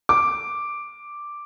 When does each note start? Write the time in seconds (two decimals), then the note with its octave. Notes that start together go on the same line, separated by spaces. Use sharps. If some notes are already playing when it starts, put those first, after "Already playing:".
0.09 D6